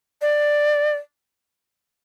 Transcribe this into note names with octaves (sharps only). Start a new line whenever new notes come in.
D5